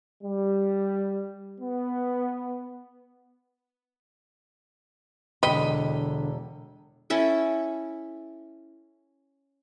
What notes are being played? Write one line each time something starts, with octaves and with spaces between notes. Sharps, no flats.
G3
B3
E1 D3 D#5 G5 B5
C#4 E4 A4